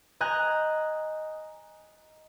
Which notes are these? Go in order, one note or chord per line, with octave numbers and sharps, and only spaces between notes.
D#5 G#5 A#5 F#6 G6